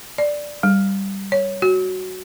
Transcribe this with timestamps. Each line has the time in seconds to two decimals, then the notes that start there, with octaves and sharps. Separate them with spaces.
0.18 D5
0.63 G3
1.32 C#5
1.62 F#4